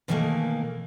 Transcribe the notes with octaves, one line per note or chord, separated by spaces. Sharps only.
B2 D#3 E3 G3 A3 A#3